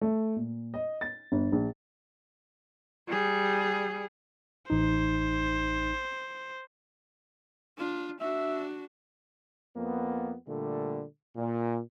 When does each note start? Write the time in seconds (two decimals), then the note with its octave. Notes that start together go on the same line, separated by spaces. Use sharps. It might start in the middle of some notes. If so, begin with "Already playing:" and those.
0.01 A3
0.36 A#2
0.74 D#5
1.01 A6
1.32 G1
1.52 A#1
3.08 G3 G#4
4.70 A1 D#4 C5
7.77 D4 F4
8.21 D4 F#4 E5
9.76 F2 A#3 B3
10.48 A#2 D3 G3 A3
11.36 A#2